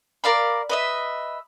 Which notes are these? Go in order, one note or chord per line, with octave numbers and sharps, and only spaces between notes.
A#4 D5 F5 B5
B4 D#5 E5